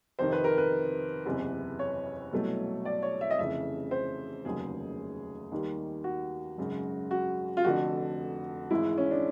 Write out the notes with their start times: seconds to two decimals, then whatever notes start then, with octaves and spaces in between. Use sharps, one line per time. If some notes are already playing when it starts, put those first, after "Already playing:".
0.19 F2 C3 D#3 C5
0.32 B4
0.44 A#4
0.58 B4
1.25 F#1 E2 C3
1.79 C#5
2.32 C2 B2 F#3 A3
2.85 D5
3.03 C#5
3.21 E5
3.31 D#5
3.38 F1 F2 C#3 E3 E5
3.91 C5
4.45 F1 D#2 C#3 F#3 G#4
5.52 D#2 D#3 G3
6.04 F#4
6.58 G#1 F#2 C#3
7.11 F#4
7.57 F4
7.64 F1 F2 D3 F#4
8.71 G#1 G#2 E3 G#3 E4
8.98 C#4
9.11 D4